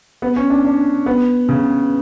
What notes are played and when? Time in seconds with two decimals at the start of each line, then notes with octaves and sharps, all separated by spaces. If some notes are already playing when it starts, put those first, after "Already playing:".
0.22 B3
0.36 C#4
0.50 D4
0.65 D4
1.06 B3
1.49 C#3